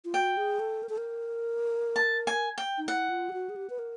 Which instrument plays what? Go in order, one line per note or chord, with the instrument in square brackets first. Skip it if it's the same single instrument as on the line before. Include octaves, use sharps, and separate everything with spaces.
[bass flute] F4
[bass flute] F#4 [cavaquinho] G5
[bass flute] G#4
A4
A#4
A4
A#4
[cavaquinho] A5
G#5
G5
[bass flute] D#4
[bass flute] E4 [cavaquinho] F#5
[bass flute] F4
G4
F#4
G#4
G4
B4
A#4